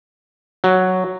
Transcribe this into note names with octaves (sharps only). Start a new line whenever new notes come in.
F#3